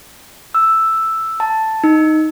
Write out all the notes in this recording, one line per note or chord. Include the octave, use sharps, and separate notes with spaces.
E6
A5
D#4